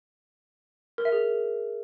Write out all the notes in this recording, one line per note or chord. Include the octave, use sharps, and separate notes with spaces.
A#4
E5
G#4